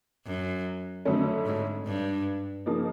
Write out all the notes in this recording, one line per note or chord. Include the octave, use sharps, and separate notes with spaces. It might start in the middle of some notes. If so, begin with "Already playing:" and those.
F#2
F2 D3 F#3 A3 C#4
G#2
G2
C#3 F3 A#3 D#4